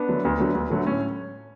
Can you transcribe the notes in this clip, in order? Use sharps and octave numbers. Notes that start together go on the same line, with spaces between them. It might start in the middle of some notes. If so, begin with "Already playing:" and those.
Already playing: B3 D4
D3 F#3 A3
D2
D3 F#3 A3
D2
D3 F#3 A3
A2 C#4